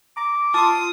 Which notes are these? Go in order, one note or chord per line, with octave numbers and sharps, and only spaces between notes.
A#5 D6
F4 A5 C6 D#6